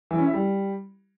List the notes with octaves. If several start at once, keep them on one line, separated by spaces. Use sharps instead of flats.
E3
C#4
E4
G3